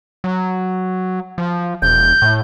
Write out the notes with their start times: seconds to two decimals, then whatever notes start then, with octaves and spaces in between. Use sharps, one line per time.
0.24 F#3
1.38 F3
1.82 E1 G6
2.22 A2